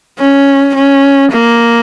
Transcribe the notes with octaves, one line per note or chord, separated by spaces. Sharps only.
C#4
C#4
A#3